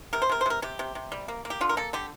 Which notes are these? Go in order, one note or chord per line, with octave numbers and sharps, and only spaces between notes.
C3 A#4
C5
C3 A#4
C5
C3 A#4
C3 G4
C3
C3
G3
A#3
A#3
G4
D3 F4
A#4
A#3 A4
D3 G4